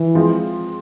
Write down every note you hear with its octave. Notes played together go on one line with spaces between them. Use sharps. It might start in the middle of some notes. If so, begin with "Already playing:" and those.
Already playing: E3
F3 G#3 C4 F4